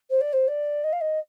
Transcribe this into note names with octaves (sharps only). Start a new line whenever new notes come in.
C5
D5
C5
D5
D#5
F5
D#5